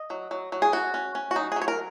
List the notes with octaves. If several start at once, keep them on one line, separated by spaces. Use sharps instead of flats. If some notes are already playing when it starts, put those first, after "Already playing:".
Already playing: D#5
F#3
F#3
F#3
G#4
C#4 F#4
C#4
C#4
F#4
F#3 D#4
G#4
F#3
C#5
A#4